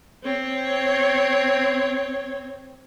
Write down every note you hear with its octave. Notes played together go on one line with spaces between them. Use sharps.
C4 C#5